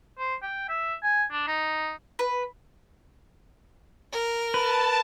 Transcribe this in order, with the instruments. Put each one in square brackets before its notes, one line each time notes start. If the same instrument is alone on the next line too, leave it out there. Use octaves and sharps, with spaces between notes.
[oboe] C5
G5
E5
G#5
D4
D#4
[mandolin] B4
[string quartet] A#4
[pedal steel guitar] B4 [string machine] A5